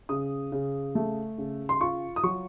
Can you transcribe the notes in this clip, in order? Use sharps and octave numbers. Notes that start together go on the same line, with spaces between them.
C#3 D#6
C#3
A3
C#3
C6
F4 C#6
D#6
F#3 C#6